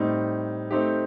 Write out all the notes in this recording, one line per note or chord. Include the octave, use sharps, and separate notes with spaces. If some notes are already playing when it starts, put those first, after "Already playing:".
Already playing: A2 G3 C4 D#4
A3 C4 D#4 G4